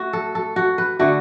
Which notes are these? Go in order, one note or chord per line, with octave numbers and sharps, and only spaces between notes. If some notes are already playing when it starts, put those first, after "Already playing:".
Already playing: A3 F#4
A4
A4
F#4
B4
D3 A3 F#4